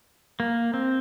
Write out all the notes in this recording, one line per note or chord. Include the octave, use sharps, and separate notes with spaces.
A#3
C4